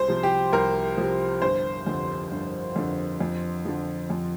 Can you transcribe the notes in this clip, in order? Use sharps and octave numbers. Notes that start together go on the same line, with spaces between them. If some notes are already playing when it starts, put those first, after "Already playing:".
Already playing: C2 C5
C3 F3
G4
C2 A#4
C3 F3
G1 C5
F2 D3
G1
F2 D3
F2
D3 F3
F2